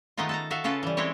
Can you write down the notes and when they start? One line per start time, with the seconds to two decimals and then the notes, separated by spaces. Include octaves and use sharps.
0.17 D#3 G#3 A3 B3 D#4 F4
0.29 A4 A5 A#5
0.50 F#4 A4 E5 F5
0.64 C#3 C#4 F4 A4 B4
0.83 E3 G3
0.97 G#3 C4 E4 G4 C#5